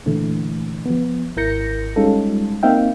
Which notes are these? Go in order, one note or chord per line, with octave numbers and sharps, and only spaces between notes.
A#2 D3 E3 A3
F3 B3
G#1 E4 A#4 G6 A#6 C#7
G3 G#3 C#4 D#4 F4 A4
A#3 C4 D#4 E5 F5 G5